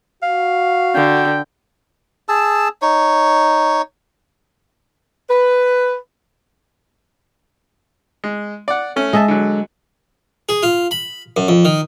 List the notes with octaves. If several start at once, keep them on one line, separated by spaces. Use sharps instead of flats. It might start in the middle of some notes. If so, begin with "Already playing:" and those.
F#4 F5
D3 G5
G#4 A5 E6
D#4 C#5
B4
G#3
D5 F#5
A3 C#4
G#3 D#5 E5 A5
D3 F#3
G#4
F4
B5
F#2
F2
D#3